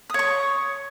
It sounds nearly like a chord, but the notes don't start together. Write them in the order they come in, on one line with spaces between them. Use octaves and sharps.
D#6 C#5 C#6